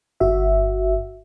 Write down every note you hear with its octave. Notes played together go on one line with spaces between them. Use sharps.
G1 F#4 E5